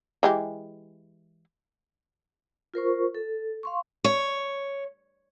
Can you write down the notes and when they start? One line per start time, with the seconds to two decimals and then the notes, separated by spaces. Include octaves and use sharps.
0.23 E3 G#3 G4
2.74 F4 A#4 C5 C#6
3.15 A4
3.63 F5 C6 C#6
4.04 C#5